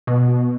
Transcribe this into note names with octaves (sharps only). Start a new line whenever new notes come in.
B2